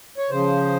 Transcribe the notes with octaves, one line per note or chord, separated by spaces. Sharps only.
C#5
C#3 F3 C5